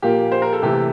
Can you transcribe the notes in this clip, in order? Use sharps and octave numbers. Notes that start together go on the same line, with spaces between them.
A#2 F3 A#3 G4
C5
A#4
A4
C3 E3 A3 G4